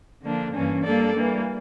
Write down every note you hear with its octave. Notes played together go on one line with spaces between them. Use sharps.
D3 F3 A#3 D4
G2 E3 A#3 C#4
G3 A#3 D4 A4 D5
E3 G3 A#3